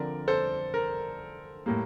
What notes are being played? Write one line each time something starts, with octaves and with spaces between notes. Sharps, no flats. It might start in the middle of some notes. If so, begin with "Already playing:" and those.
Already playing: D3 F3 C4 A#4 D5
A4 C5
A#4
A2 G3 A#3